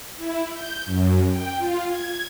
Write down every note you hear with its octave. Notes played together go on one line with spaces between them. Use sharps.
E4
G6
F#2
G5
F4
G#6